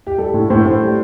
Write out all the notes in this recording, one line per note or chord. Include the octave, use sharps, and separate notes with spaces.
G4
G3 A4
A2
A2 C5
A2
G3